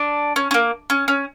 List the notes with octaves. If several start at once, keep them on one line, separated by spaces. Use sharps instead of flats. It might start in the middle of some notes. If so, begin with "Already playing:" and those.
Already playing: D4
C#4
C#4
A#3
C#4
C#4